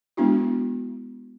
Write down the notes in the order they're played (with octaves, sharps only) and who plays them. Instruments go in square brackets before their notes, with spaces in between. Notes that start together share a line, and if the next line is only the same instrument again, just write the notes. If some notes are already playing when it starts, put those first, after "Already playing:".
[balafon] G#3 B3 D4 E4 F#4